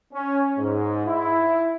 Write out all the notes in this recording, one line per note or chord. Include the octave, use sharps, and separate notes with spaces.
C#4
G#2
E4